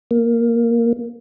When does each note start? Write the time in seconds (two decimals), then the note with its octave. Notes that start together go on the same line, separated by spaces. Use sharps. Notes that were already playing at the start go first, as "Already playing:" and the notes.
0.11 A#3